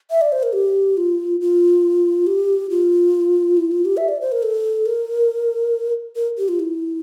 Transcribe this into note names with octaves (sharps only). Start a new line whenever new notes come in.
E5
D5
C5
A#4
G4
F4
F4
G4
F4
E4
F4
G4
E5
D5
C5
A#4
A4
A#4
A#4
G4
F4
E4